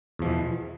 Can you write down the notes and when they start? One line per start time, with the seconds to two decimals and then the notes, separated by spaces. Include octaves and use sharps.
0.19 E2
0.22 F3
0.25 B2
0.28 E3